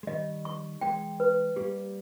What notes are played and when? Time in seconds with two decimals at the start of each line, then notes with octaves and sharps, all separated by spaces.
0.03 G#3
0.07 D#3 G3 D#5
0.45 C#6
0.81 E3 G#3 G5
1.20 B4
1.56 G3 A#3 G4